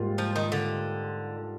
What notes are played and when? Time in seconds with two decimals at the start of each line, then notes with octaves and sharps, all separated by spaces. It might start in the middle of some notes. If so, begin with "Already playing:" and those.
Already playing: G#2 G3 A#3 F4
0.18 F3
0.36 D#3
0.52 D3